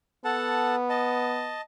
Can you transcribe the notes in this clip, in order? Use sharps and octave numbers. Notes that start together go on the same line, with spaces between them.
B3 A4 F#5 A5
D#5 A5